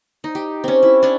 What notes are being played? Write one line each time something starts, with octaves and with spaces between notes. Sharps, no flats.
D#4
G4
C4 C#4
E4
C#4 D4